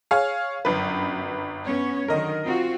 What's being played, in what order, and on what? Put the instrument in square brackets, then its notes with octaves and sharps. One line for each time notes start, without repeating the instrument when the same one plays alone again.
[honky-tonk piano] G#4 C#5 F5
[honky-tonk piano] G1 B4 [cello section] F#2
[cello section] B3 C#4 C#5
[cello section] D3 D#3 F#3 [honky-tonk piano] A#4 D#5
[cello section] C4 F4 F#4